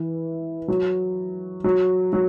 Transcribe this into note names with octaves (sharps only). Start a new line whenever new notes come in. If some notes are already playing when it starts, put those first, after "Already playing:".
Already playing: E3
F#3
F#3
F#3